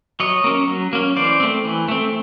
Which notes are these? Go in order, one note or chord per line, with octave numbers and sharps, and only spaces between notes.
F#3 C#5 D#5
A#3 C#4
F#3
A#3 C#4
E3 C5 D5
A3 C4
E3
A3 C4